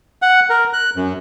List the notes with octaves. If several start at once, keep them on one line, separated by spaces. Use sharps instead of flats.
F#5
A#4
F#6
F#2